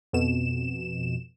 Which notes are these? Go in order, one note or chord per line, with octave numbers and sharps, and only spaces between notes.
F2 B2 E7